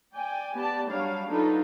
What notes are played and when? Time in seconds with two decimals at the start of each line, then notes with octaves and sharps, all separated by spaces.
0.14 D5 G5 G#5
0.55 B3 G4 D5 A5
0.88 F#3 G3 D4 C#5 F5
1.29 F#3 D4 D#4 F4 A4 B4